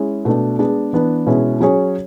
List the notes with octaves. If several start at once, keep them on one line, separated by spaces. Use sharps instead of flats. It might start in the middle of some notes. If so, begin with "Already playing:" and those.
Already playing: G#3 C#4 E4
B2 A3 D4
G#3 B3 D4 G#4
E3 B3 D4
B2 G#3 C#4 E4
F#3 C#4 G#4 C#5